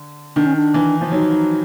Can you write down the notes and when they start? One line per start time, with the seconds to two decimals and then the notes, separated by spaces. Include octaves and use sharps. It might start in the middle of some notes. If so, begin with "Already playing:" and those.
Already playing: D3
0.36 D#3 D4
0.46 C#4
0.56 D4
0.74 E3
1.01 F3
1.11 F#3 D#4